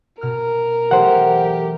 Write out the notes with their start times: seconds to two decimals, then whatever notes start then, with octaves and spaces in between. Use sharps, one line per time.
0.21 B2 A#4 F6
0.91 E3 F#3 A3 G4 C5 F#5